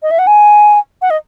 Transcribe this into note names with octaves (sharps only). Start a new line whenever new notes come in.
D#5
E5
F#5
G#5
F#5
D#5